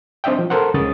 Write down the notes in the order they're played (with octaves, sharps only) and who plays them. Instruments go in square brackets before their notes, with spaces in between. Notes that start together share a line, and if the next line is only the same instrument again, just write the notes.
[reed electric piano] C4 D4 D#5 E5 G5
F3
A4 A#4 C5 F#5
C#2 C#3 D#6 A6